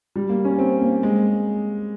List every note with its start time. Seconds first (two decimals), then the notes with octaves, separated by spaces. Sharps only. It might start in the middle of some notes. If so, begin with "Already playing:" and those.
0.16 G3
0.29 A#3
0.45 C#4
0.59 C4
0.82 A#3
1.03 G#3